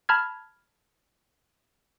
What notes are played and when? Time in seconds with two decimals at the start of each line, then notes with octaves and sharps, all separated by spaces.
0.09 A5 B5 F6 G#6